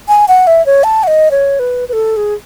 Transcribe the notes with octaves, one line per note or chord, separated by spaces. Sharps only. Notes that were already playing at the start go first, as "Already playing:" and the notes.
G#5
F#5
E5
C#5
A5
F#5
D#5
C#5
B4
B4
A4
G#4